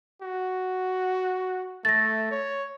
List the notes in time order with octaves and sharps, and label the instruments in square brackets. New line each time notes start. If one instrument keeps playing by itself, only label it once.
[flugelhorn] F#4
[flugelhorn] A3 [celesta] A6 A#6
[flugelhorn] C#5